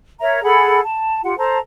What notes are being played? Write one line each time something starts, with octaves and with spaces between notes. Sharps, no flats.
A#4 C#5 E5 A#5
G#4 A4 F#5 B5
A5
F4 G4 F#5
A4 C5 A5 A#5